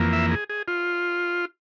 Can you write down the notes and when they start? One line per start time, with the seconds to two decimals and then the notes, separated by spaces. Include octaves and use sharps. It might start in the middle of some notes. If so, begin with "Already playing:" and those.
Already playing: F2 E3 A#3
0.13 E5
0.31 G#4
0.50 G#4
0.68 F4